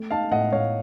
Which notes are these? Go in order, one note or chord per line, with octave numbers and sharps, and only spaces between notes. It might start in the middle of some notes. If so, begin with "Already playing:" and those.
Already playing: A3
D#4 F5 A5
A2 D#5 F#5
A2 C#5 F5